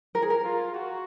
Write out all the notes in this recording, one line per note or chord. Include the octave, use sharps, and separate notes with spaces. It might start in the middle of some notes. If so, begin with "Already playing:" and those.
A#4
G#4
A#4
F4
F#4